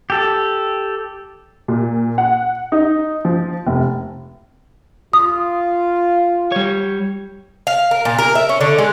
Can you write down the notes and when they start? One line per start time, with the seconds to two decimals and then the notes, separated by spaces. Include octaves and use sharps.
0.10 G4 A4
1.68 A#2
2.18 F#5
2.72 D#4
3.25 F3
3.67 F1
5.13 F4 D#6
6.52 G3 C#5
7.67 F5
7.91 A#4
8.05 A#2
8.18 A#4
8.35 E5
8.49 C#4
8.61 D3
8.78 G#3